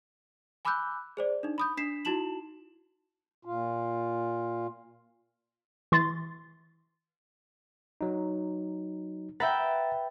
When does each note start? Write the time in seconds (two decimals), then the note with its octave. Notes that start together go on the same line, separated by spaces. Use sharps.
0.65 G#5 B5 D6 E6 F#6 G6
1.17 G#4 C5 D5
1.43 D4 D#4
1.58 B5 D#6 G6
1.77 D4 B6 C7 E7
2.05 D#4 E4 F#4 A5 E7 F#7
3.45 A#2 F4
5.92 E3 C6 A6
8.01 F#3 D#4
9.40 B4 E5 F#5 G5 A#5 A6